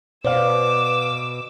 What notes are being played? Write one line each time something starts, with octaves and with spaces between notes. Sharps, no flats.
B2 B4 C5 D5 F5 D6 E6